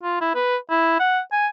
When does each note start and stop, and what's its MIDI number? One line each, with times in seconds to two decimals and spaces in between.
0.03 0.20 65
0.21 0.32 64
0.35 0.56 71
0.70 0.95 64
1.00 1.20 78
1.32 1.47 80